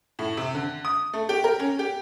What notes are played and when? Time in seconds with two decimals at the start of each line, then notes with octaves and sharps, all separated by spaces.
0.19 A2
0.37 C3
0.55 D3
0.85 D#6
1.13 A3
1.29 G4
1.44 A#4
1.60 C#4
1.79 G4